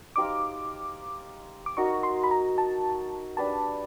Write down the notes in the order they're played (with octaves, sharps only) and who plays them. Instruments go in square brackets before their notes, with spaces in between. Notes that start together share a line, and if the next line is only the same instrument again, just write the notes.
[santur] D#4 G4 C5 F5 [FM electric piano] D6
[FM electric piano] D6
[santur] D#4 F#4 A#4 D#5 [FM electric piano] C#6
[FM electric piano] C6
B5
A#5
A5
[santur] D4 G4 B4 [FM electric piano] A5